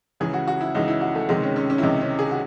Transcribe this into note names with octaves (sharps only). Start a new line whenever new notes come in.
C#2 C#3 E3 G#4
F#4
F#4
E4
C#2 C#3 E3 D#4
E4
F#4
A3
C#2 C3 D#3 G#3
C#4
C#4
C#4
E4
C#2 C3 D#3 D#4
C#4
G#4
F#4